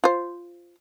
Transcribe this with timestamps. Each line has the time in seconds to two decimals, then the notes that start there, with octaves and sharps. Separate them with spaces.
0.04 F4 C5